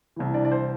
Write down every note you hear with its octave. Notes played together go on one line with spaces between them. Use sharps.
C2 C3 E3
D4 D5
D5
C5